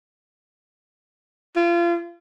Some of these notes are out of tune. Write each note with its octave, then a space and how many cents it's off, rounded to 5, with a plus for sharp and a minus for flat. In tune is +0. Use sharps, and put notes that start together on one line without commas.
F4 -30